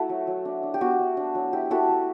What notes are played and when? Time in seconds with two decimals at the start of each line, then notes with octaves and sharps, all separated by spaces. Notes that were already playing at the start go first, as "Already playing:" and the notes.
Already playing: A3 E4 F#4 A4
0.09 F#3
0.27 F#3
0.45 D4
0.63 D4
0.74 G4
0.81 B3 F#4
0.99 D4
1.17 D4
1.35 F#3
1.53 E4 G4
1.70 E4 F#4 A4
1.89 A3